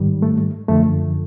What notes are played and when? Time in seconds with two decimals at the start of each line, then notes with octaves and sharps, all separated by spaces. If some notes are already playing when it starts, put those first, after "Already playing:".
Already playing: G#2 D#3 G3
0.22 A3
0.68 F#2 D3 F3 A3